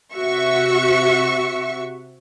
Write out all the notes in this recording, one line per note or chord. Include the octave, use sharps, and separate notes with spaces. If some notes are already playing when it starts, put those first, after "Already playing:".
C3 F#4 E5 C#6